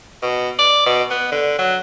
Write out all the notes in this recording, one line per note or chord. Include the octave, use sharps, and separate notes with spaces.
B2
D5
B2
B3
D3
F#3